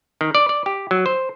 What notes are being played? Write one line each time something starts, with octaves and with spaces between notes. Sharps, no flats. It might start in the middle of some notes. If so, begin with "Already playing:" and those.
D#3
D5
D5
G4
F#3
C5